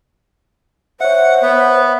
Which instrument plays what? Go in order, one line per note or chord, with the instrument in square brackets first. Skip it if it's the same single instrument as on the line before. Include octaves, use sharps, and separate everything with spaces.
[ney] C5 [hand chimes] C#5 E5 [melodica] F#5
[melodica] B3 B4